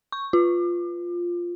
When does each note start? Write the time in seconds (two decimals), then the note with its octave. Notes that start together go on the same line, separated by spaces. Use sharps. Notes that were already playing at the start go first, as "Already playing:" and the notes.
0.12 C#6
0.33 F4